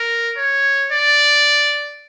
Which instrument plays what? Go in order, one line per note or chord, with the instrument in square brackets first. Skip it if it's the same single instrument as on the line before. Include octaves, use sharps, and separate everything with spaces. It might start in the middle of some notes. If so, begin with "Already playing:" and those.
Already playing: [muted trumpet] A#4
C#5
D5